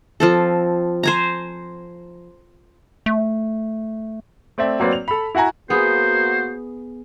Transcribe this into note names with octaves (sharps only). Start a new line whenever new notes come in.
F3 C4 A4
C5 G#5 A#5
A3
A3 C4 D5 E5
F#3 A#3 C4 B4 D5
F7
A4 B5
E4 F#4 F#5 G#5 A#5
A#3 B3 F#4 G#4 C5